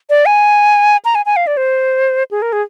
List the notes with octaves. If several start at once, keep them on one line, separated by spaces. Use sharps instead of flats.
D5
G#5
A#5
G#5
G#5
F5
D5
C5
G#4
A#4
G#4